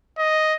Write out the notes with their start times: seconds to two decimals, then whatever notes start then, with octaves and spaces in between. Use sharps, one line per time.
0.18 D#5